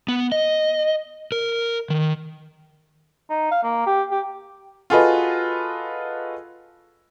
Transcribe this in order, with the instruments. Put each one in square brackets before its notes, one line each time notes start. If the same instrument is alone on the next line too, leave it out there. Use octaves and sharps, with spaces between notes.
[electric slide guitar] B3
D#5
A#4
D#3
[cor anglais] D#4
F5
A#3
G4
G4
[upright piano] F4 F#4 G#4 A4 B4 D#5